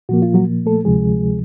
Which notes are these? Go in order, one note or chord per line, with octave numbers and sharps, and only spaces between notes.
A#2 F3 A#3 F#4
F4
F#3 F#4
A3 A4
D2 C3 F3 G#3 G#4